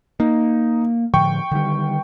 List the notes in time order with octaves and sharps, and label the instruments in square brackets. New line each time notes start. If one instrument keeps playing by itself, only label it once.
[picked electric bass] A#3 [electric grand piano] D#4
[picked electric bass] A2 D3 F3 [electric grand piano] G5 C#6
[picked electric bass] D3 D#3 G3